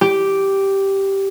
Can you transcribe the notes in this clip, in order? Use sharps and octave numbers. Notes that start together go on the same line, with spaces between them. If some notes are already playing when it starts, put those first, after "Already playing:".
G4